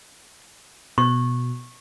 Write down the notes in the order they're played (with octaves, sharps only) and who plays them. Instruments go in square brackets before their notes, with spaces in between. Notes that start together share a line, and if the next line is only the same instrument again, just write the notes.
[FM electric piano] B2 [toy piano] C#6